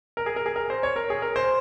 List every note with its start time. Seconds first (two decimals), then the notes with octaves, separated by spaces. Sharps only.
0.17 A#4
0.26 G#4
0.36 A#4
0.46 G#4
0.56 A#4
0.70 C5
0.83 C#5
0.96 A#4
1.10 G#4
1.22 A#4
1.36 C5